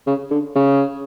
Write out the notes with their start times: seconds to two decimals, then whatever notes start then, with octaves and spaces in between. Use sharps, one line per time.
0.07 C#3
0.31 D3
0.55 C#3